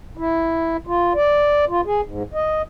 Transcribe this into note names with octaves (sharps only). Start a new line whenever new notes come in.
E4
F4
D5
F4
G#4
G#2
D#5